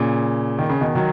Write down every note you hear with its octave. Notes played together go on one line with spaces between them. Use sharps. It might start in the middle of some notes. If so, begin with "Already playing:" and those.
Already playing: A#2 C#3
D#3
C#3
B2 D#3
D#3 F#3